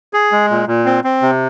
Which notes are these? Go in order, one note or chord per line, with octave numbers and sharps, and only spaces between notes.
G#4
G#3
A#2
A#2
C4
C4
C3